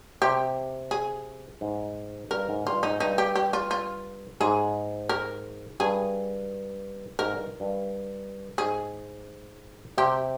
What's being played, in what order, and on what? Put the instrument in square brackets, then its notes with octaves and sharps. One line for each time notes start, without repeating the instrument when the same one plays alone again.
[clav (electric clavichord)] C3 [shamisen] G4
[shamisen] G#4
[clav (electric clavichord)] G#2
[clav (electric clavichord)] G2 [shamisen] A#4
[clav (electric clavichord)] G#2
[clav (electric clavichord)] G2 [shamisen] F4
[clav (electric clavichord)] G#2 [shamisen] D#4
[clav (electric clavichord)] G2 [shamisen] D#4
[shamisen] G4
G4
F4
F4
[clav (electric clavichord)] G#2 [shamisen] G#4
[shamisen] A#4
[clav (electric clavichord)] G2 [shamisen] G#4
[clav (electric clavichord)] G#2 [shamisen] A#4
[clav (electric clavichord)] G2
G2
[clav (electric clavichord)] G#2 [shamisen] G#4
[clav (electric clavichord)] C3 [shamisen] G4